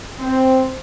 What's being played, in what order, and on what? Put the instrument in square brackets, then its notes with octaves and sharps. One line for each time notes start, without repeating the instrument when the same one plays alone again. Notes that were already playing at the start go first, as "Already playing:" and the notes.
[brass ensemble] C4